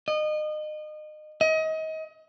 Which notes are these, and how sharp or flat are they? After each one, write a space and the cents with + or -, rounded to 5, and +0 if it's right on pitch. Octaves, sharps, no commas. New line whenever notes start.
D#5 -30
D#5 +30